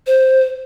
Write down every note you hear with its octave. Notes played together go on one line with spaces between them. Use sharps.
C5